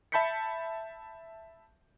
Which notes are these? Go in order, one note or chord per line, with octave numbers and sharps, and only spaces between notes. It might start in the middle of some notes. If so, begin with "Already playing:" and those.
E5 A5 B5 G6 B6 C#7